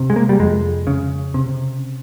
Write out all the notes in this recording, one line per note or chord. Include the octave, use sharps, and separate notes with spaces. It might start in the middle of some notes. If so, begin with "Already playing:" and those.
Already playing: C3
G#3
A#3
G3
F2 G#3
C#3
C3